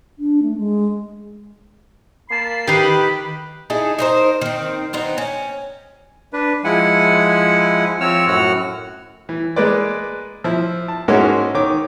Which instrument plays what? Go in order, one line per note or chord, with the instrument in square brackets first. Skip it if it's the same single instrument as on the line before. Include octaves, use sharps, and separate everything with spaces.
[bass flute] D4
A3
G#3
[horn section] A#3 A5 B5 [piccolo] C7
[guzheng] D#3 D#4 [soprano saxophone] G4 [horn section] B4 B5
[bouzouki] D#4 E4 G#4 A4
D#4 A#4 C5
D#3 C4
B3 C4 D#4
C#4
[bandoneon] D4 B4
F3 G#3 E4 F#5 G#5
F3 C4 C#5 E6 F6
F#2 A2 F#4 F#5 F6
[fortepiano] E3
G#3 A#3 B4 D5
F3 E4
A5
G#2 G#3 A#3 C#4 E4 F#4
D#3 C#5 D6